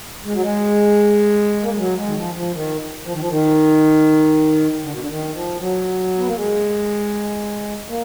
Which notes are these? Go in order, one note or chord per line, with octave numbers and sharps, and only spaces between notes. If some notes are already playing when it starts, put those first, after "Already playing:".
G#3
F#3
G#3
A#3
G#3
F#3
G#3
D#3
F3
F3
D#3
F3
D#3
F3
D#3
D3
B2
D3
D#3
F3
F#3
B3
A#3
G#3
A#3